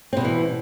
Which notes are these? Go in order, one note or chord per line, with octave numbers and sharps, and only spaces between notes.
B2 E3 G3 C4